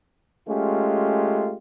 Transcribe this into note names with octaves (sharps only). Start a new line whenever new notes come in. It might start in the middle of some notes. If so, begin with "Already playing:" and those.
G#3 A3 C#4 F4 G4